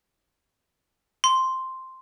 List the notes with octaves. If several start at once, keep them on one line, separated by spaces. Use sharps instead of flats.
C6